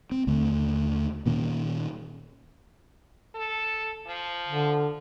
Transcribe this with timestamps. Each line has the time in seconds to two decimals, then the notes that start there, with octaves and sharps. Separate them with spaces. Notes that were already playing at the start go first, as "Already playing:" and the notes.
0.11 C4
0.27 D#2 D3 A3
1.26 A#2 D#3 A#3 C#4
3.35 A4
4.07 F3
4.48 D3